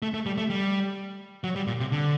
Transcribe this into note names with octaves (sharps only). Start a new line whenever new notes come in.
A3
A3
G3
A3
G3
F#3
G3
A#2
C3
D3